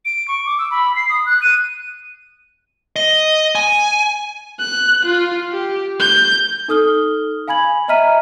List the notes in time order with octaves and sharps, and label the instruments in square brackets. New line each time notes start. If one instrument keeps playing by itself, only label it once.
[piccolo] D7
C#6
D6
E6
B5
C7
D#6
F#6
D#7
[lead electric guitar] D#5
G#5
[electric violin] F#6
F4
G4
G6
[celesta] D#4 A4 D#6 F6 G7
F5 G#5 B5 G#6 F#7
D#5 E5 A#5 F6 B6 D#7